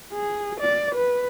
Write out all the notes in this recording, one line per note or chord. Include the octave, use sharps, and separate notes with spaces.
G#4
D5
B4